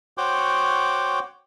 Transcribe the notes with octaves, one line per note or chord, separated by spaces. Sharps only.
F#4 C5 C#5 F#5 G5 D6